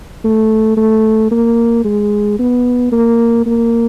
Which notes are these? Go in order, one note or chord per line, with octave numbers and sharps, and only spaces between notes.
A3
A3
A#3
G#3
B3
A#3
A#3